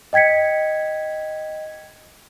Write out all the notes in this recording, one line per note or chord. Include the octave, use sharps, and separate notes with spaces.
D#5 G5 G#6 B6 C#7